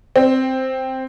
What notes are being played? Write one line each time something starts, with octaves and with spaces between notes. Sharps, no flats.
C4